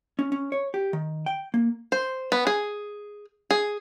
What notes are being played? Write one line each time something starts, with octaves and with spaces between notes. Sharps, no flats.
C#4
C#4
C#5
G4
D#3
G5
A#3
C5
B3
G#4
G#4